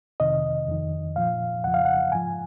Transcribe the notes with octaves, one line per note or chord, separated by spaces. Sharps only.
F2 C3 D#3 D#5
F2 D#3
A#2 F3 F5
F2 C#3 F3 F#5
F5
F#5
G#2 F3 G#5